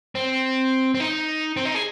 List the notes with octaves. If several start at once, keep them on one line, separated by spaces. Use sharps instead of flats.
C4
C4
D#4
C4
D#4
G#4